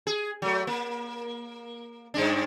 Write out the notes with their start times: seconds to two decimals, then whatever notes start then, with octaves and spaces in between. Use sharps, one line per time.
0.07 G#4
0.42 F#3 A3
0.67 A#3
2.14 G2 G#3 D4